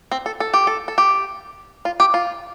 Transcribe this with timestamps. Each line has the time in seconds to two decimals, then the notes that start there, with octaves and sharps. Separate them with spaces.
0.12 C4
0.26 A4
0.40 A4
0.54 G4
0.67 A4
0.88 A4
0.98 G4
1.85 F4
2.00 G4
2.14 F4